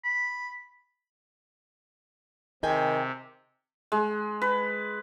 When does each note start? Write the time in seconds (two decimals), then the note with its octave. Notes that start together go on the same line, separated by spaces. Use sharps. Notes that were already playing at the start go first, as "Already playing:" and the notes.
0.04 B5
2.63 C3 D#3 G#4 G5 G#5
3.92 G#3
4.42 B4